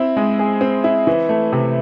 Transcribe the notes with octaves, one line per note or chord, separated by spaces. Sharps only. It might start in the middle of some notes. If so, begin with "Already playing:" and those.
Already playing: C4 E4
G#3
G#4
C4
E4
E3
A3
C3